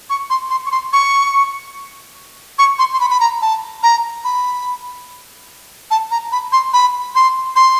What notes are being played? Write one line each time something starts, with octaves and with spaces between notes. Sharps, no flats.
C#6
C6
C6
C#6
C6
C#6
C#6
C6
C6
B5
B5
A#5
A5
A#5
B5
A5
A#5
B5
C6
B5
C6
C6